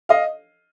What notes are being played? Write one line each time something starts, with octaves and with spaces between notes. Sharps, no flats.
D#5 F5